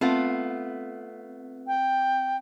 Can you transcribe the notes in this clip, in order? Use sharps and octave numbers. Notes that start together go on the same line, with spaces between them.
A3 B3 C4 F4
G5